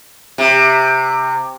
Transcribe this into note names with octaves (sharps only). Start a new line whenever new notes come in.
C3